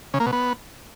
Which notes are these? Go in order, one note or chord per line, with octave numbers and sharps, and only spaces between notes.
C#3
A#3
B2
B3